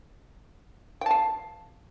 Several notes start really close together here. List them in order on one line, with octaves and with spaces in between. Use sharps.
G5 A5 F5